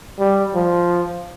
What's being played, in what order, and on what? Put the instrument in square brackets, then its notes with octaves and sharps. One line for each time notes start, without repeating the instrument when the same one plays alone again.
[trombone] G3
F3